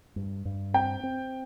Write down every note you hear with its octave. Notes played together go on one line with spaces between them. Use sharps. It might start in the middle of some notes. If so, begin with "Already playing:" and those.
G2
G2
C4 G5
C4